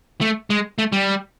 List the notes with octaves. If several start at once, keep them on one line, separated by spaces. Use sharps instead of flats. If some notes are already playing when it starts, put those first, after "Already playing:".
A3
G#3
A3
G3